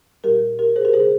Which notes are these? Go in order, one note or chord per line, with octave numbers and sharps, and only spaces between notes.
A#2 G3 G4 A#4
G4 A#4
G#4 C5
G4 A#4
C3 G3 G#4 C5